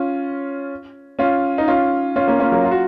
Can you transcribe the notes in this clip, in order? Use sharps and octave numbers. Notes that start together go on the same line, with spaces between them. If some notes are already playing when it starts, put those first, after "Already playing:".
Already playing: C#4 F4
C#4 F4
D#4
C#4 F4
C#4 F4
A#3 C#4
C#4 F4
F#3 A#3
F4
F#4